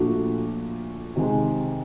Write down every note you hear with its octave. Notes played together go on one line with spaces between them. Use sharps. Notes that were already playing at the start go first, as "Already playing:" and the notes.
Already playing: A#2 F3 A3 D4 F#4
C3 D#3 G#3